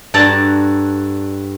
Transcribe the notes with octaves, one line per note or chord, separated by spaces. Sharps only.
G2 F#4 A4 D5 A5 A#5